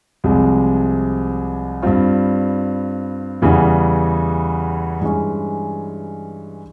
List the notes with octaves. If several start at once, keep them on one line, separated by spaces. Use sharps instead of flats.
C2 C3 F3 G#3
G2 G3 C4 F4
E2 C#3 E3 G3
G2 E3 G#3 C#4